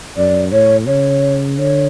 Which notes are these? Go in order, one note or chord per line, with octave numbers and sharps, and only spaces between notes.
F#2 D5
A2 C#5
C#3 C#5
D3 C#5